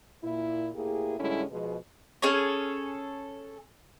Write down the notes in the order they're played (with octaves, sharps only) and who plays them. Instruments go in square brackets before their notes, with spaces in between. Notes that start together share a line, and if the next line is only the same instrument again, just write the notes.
[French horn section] A#2 E4
A2 A#3 E4 G4 G#4
A2 D3 G3 G#3 C#4 E4
B2 F3 G#3
[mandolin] C#4 G#4 A4 C#5